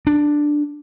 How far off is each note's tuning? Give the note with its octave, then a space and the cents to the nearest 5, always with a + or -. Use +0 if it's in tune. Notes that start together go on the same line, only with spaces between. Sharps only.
D4 +5